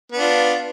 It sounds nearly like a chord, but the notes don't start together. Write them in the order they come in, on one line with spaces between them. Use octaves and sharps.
B3 D4 F4